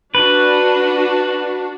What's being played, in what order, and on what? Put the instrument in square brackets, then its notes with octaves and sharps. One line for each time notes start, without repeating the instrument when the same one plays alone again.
[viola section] D4 F#4 [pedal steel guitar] B4